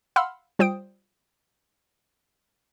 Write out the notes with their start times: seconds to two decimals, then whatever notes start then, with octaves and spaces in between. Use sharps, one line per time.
0.16 F5 F#5 B5 C6 E6 F6
0.59 G3 F4 C5 G5 D#6 D7